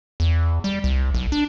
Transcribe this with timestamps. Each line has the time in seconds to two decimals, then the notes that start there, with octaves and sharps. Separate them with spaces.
0.20 E2
0.64 G3
0.84 C2
1.14 B1
1.32 D4